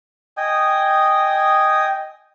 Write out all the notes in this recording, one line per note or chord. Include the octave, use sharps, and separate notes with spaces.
D#5 G5 G#5 D#6